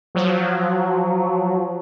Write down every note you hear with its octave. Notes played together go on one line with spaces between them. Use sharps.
F3 F#3